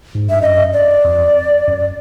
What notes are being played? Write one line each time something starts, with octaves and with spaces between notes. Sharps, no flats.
G#2
G2 E5
F#2 D#5
D5
F2
F#2